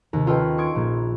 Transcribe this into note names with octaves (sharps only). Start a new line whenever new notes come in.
D#2 C3
C#4 F4 A4 B4 D#5 G5
C6 C#6 D#6 G#6 D7
A#1 A#2